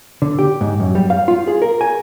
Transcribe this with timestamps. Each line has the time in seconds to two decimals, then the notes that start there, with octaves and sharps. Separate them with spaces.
0.22 D3
0.39 G4
0.61 G#2
0.80 F#2
0.95 G3
1.10 F5
1.28 F4
1.47 G#4
1.62 A#4
1.81 G#5